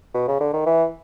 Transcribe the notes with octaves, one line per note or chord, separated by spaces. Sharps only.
B2
C#3
D3
D#3
E3